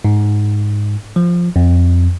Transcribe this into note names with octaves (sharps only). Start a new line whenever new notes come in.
G#2
F3
F2